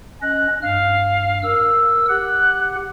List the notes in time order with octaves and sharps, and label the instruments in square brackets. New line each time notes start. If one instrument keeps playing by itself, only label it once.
[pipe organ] C#4 D#5 [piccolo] F#6
[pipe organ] G2 F6 [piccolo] F5
[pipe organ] A#4 E6
[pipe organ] G4 F#5 [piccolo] F#6